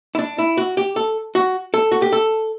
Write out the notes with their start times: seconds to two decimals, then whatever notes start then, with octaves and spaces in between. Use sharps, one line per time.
0.15 E4
0.19 D4
0.38 E4
0.57 F#4
0.77 G4
0.96 A4
1.35 F#4
1.74 A4
1.92 F#4
2.02 G4
2.13 A4